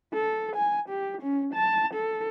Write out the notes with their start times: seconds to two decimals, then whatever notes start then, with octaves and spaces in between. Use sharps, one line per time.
0.13 A4
0.56 G#5
0.89 G4
1.22 C#4
1.54 A5
1.94 A4